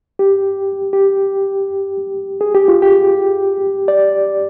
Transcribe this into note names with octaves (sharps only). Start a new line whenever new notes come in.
G4
G4
G#4
G4
F4
G4
D5